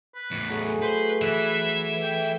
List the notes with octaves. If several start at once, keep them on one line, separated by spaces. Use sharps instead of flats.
B4
E2 A2
F#3 A3 G#4
B4 C5
E3 B4 E5
G5